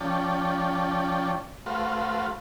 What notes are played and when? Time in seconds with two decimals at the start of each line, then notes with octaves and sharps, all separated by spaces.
0.01 F3 C#4 D5 G5 A5
1.66 A3 F#4 B4 C5 F5